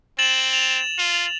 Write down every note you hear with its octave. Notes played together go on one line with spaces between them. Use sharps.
C4 A6 E7 F#7
F7
F4